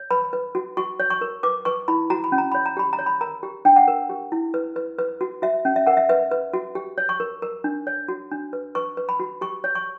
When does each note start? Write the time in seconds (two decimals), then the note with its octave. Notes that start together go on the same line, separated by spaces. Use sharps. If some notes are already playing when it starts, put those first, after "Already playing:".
Already playing: C#5
0.11 B4 B5
0.33 B4
0.55 F#4
0.77 F#4 C#6
1.00 C#5
1.10 C#6
1.21 A#4
1.43 B4 D6
1.65 B4 C#6
1.88 E4 B5
2.10 F#4 A#5
2.24 B5
2.32 C#4
2.38 A#5
2.52 C#5 B5
2.66 A#5
2.77 G4 B5
2.93 A#5
2.99 C#5
3.06 B5
3.21 A#4 A#5
3.43 G4
3.65 D4 G5
3.76 F#5
3.88 A#4
4.09 G4
4.32 E4
4.54 B4
4.76 B4
4.99 B4
5.21 F#4
5.42 F#4 E5
5.65 C#4
5.76 E5
5.87 A#4 F#5
5.97 E5
6.09 B4 E5
6.31 B4
6.54 F#4
6.75 G4
6.98 C#5
7.09 C#6
7.20 A#4
7.42 A#4
7.64 D4
7.87 C#5
8.08 F#4
8.31 D4
8.53 B4
8.75 B4 C#6
8.97 B4
9.09 B5
9.20 F#4
9.41 G4 C#6
9.64 C#5
9.75 C#6